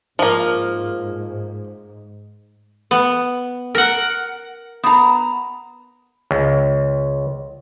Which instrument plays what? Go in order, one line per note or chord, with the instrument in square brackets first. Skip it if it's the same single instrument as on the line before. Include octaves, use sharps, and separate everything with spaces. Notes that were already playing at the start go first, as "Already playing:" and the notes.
[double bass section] G#2 [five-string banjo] F3 A#3
[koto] B3
A#4 F#5
[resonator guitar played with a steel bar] B3 A#5
[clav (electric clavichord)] C#2